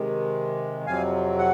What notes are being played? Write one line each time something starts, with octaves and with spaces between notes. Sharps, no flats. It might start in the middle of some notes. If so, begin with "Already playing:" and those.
Already playing: C3 D#3 G#3
F2 C3 F#3 C4 F5 G#5
F#5